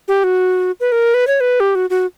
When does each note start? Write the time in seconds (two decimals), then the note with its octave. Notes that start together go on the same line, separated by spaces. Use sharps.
0.08 G4
0.24 F#4
0.80 B4
0.92 A#4
1.14 B4
1.27 C#5
1.40 B4
1.60 G4
1.75 F#4
1.90 F#4